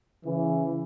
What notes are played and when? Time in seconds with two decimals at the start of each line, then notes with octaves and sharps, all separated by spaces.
0.25 C#3 E3